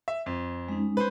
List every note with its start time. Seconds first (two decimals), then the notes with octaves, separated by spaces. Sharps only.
0.08 E5
0.26 F2
0.69 G#3 C#4 D#4
0.97 B4 C5